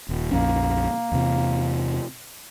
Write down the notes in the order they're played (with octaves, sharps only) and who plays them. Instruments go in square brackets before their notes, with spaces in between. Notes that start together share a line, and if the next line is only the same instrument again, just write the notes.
[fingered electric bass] D#1
[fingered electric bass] A#1 F2 C#4 [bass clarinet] A#3
[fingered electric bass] E2 C3